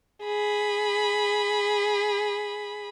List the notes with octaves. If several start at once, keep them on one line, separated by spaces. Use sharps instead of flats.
G#4 B5